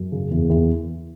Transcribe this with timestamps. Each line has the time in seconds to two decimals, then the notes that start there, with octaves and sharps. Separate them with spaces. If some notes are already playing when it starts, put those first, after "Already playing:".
Already playing: F#2
0.12 C#3
0.31 E2
0.49 E2